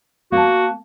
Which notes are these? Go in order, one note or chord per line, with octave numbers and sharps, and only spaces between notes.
A#3 F#4 A5